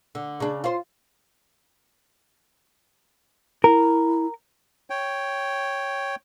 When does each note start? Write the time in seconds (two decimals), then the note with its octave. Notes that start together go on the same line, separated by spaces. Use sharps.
0.15 D3
0.40 C#3 D4
0.64 F4 C5
3.64 E4 A#4
4.90 C#5 G5